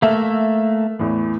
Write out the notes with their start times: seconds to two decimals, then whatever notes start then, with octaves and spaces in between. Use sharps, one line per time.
0.02 A3 A#3 E5 F6
0.99 E2 A2 E3